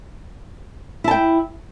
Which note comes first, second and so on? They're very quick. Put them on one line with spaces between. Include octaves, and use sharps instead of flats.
E4 A5 G5